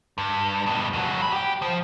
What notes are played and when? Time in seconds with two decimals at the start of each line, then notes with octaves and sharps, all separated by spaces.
0.18 G2
0.66 G2 B2
0.93 F2 F#3
1.21 B2 B5
1.33 G4 G5
1.62 F3